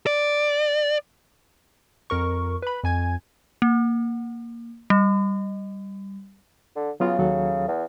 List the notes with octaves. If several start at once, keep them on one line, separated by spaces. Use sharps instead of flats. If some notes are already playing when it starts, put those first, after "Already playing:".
D5
F2 A#4 C#6
B4 B5
F2 G#5 G#6
A#3
G3
D3
C#3 F#3 B3 F4
D#2 F#3 A4
E2